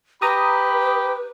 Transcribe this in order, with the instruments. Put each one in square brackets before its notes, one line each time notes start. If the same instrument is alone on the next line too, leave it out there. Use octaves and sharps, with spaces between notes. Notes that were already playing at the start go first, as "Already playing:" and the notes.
[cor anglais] G4 [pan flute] B4 [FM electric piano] A#5 D#6 [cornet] B5